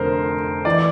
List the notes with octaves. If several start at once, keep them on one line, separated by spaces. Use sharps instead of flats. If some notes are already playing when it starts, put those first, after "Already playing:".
Already playing: F1 F2 D3 A#4 C5
E3 D5